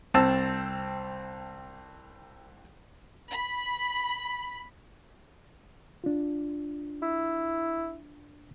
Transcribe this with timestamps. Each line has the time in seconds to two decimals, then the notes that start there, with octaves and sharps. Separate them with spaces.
0.14 C2 C4 C5 A5 E6
3.30 B5
6.04 D4 F4
7.03 E4